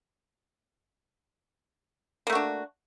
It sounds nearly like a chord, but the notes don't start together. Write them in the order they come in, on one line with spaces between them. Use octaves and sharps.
A#3 A3 F#4 D4